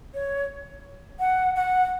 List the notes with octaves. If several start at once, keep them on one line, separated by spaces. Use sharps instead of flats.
C#5
F#5
F#5